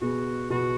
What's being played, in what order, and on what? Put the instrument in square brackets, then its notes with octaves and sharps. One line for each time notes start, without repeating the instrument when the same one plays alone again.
[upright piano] B2 B3 G#4 [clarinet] F#4
[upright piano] B2 B3 G#4 [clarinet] F#4